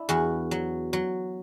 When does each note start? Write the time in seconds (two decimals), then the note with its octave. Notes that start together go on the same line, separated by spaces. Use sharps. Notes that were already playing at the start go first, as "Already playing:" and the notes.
Already playing: D4 E4
0.09 E2 F#4
0.51 F#3
0.93 F#3